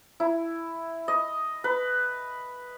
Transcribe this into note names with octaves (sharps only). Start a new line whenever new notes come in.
E4
D#5
B4